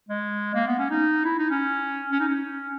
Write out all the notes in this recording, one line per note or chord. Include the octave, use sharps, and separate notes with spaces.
G#3
A#3
B3
C#4
D#4
E4
D#4
C#4
C#4
D#4
C#4